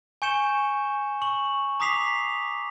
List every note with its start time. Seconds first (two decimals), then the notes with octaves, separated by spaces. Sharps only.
0.22 G#5 C#6 G6 C#7 E7 G7
1.22 C#6 F#7
1.80 A#5 D6 D#6 B6 C7 F7